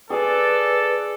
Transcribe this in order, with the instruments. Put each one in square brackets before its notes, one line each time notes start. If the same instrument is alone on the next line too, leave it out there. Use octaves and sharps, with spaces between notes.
[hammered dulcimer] G#4 G#5 [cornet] A4 [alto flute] B4 [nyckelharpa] D5